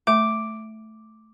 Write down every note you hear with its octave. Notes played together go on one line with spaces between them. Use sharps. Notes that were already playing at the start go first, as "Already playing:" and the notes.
A3 E5 D6